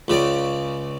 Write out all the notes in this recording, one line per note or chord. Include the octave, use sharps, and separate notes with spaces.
C#2 C#3 D5